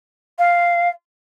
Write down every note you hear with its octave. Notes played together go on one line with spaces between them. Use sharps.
F5